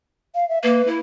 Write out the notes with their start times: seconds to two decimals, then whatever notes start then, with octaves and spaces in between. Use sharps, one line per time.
0.35 F5
0.49 E5
0.63 A#3 B4
0.87 E4